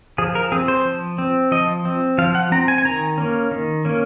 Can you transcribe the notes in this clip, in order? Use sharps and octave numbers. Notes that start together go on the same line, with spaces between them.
F3 G#4
A#4
C4 G#4
C5
F3
C4
F3 D#5
C4
F3 F5
F#5
C4 A#5
G#5
G#5
D#3 A#5
A#3 C#4
D#3
A#3 C#4